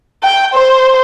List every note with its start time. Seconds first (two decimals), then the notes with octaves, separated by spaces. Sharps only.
0.23 G5
0.54 C5